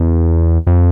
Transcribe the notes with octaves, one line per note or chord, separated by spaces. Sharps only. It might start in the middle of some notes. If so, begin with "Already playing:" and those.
Already playing: E2
F2